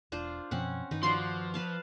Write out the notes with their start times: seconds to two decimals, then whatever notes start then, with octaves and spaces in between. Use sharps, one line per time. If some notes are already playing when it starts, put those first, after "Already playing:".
0.12 E1 D4 F4 C5
0.51 F#2 B2 F3 C4 C#4 F#5
0.91 G2 D#3 D#4 B4
1.03 F3 F#4 D5 C6
1.54 B4 F5 A5